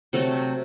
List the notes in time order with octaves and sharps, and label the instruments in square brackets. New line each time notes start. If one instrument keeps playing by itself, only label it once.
[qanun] C3 F#3 A3 F#4 A4